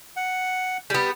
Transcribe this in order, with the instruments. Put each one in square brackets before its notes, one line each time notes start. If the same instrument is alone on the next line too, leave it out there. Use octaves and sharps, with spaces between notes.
[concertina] F#5
[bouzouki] G3 B3